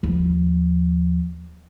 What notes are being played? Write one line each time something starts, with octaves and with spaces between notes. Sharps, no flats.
D#2 F3